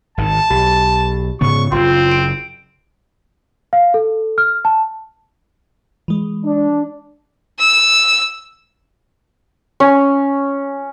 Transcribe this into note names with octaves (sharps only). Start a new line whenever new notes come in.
G#1 D#3 A5
B1 G4 B5 A6
G#2 C#3 B3 C#6
F#1 C#3 C4 F4 C6
D7
F5
A4
F6
A5
E3 G#3
D4
E6
C#4